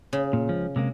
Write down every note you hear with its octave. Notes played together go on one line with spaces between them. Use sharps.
C#3
A#2
C#2 F3
C3 G#3 A#3